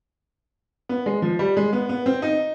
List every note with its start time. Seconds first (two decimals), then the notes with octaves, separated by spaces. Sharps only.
0.89 B3
1.06 G#3
1.22 F3
1.39 G3
1.57 G#3
1.73 B3
1.89 B3
2.06 C4
2.22 D#4